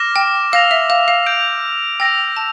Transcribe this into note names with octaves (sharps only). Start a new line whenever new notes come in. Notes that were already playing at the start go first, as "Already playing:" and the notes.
Already playing: D6 F6 A#6 E7
G5
F5 E6 A#6 F7
E5
F5
F5
G6 D7 F7
G5 E6 A#6 F7
A5